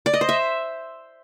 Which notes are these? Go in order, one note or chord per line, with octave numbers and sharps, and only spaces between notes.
D5
D#5
C5
E5